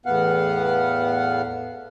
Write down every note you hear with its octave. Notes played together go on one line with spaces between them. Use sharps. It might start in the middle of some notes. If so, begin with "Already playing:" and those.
E2 A2 B3 F5 F#5